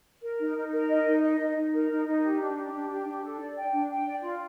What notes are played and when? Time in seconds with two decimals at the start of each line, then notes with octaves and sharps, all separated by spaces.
0.22 A#4
0.40 D#4
0.56 D#4
0.72 A#4
0.89 D#5
1.06 D#4
1.22 D#5
1.40 D#4
1.56 D#4
1.72 A#4
1.90 D#4
2.06 D#4
2.22 G4
2.40 D4
2.56 G4
2.72 D4
2.90 G4
3.07 D4
3.23 A4
3.39 D5
3.56 G5
3.73 D4
3.89 G5
4.06 D5
4.23 F4